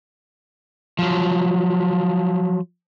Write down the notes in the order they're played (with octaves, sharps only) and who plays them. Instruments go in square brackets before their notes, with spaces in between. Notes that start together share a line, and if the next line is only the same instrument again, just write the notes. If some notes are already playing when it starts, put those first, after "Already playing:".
[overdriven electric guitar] F3 F#3